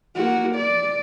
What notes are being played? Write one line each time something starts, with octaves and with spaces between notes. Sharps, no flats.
A#3 F#4
D5